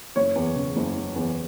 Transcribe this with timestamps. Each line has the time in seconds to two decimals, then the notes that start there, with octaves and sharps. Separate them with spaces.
0.16 F#1 C#5
0.35 E2
0.56 C#3
0.76 F#1
0.97 F#1
1.16 E2